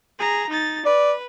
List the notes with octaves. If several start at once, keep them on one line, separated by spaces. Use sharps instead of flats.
G#4 A#5
D#4 A6
B4 D5